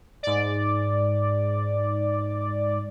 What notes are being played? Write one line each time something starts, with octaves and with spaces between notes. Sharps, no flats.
G#2 D5